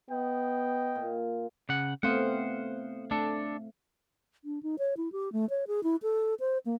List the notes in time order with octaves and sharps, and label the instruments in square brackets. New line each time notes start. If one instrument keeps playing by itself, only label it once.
[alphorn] B3 [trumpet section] D#5 G5
[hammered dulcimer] A#2
[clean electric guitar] C#3 F#5
[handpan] A3 C4 F5 [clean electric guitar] B3 C5 F#5
[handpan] A3 [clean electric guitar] D4 A4
[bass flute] D4
D#4
C#5
E4
G4
A3
C#5
G#4
E4
A4
C5
A#3